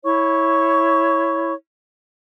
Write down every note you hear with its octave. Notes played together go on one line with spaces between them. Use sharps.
E4 C#5 C#6